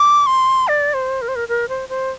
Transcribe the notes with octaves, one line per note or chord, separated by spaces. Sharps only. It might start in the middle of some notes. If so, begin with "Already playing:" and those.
Already playing: D6
C6
D5
C5
A#4
C5
A#4
A#4
C5
C5